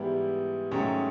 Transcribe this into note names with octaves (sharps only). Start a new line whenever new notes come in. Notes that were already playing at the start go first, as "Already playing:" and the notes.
Already playing: G#2 E3 G3 B3 E4
G#2 D#3 F#3 A3 C#4